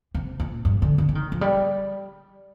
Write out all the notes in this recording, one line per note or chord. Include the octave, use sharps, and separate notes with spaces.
C3
A#2
G2
D3
D3
F3
D#3
F3
G3